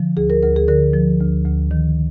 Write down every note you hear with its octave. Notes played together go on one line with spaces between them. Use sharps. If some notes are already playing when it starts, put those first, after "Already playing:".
Already playing: D3 F3
D2 G#4
A#4
D2 A#4
G#4
D3 A#4
F3
D2
D2
D#3